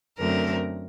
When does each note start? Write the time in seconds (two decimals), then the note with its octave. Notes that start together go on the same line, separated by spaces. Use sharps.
0.19 F#2 D3 F#3 A3 C4 A#4